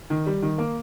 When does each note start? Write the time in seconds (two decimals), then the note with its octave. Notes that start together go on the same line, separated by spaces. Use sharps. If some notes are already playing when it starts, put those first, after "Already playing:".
0.10 D#3
0.26 G3
0.42 D#3
0.58 A#3